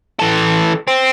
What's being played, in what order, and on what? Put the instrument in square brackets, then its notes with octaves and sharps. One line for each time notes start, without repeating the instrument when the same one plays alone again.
[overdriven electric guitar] E3 A4
C4